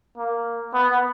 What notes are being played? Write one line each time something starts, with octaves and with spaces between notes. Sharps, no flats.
A#3
B3